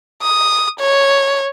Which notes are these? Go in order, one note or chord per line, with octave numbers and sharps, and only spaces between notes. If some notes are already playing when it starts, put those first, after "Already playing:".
D#6
C#5